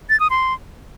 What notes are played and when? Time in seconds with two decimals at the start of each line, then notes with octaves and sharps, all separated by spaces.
0.10 A6
0.20 D#6
0.30 C6